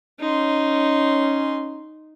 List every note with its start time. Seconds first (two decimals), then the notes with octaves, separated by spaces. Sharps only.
0.20 C#4 D#4 C6